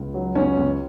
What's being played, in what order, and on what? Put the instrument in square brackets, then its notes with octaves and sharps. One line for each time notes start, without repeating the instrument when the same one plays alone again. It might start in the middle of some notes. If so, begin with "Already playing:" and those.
Already playing: [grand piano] C#2
F#3
C#2 C#4
C#2